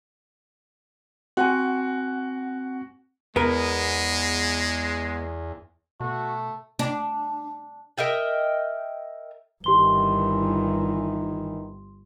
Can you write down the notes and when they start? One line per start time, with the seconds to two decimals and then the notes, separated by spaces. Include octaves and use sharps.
1.37 C4 F#4 F#5 G#5
3.36 E2 G#3 B3 A#4
6.00 B2 A3 F#4
6.79 D4
7.98 A#4 D#5 E5 G5
9.64 G1 D#3 E3 G4 C6 G7